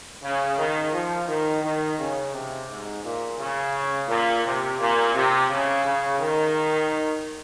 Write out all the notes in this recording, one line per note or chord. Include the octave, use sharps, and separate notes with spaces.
C#3
D#3
F3
D#3
D#3
C#3
C3
G#2
A#2
C#3
A#2
C3
A#2
C3
C#3
C#3
D#3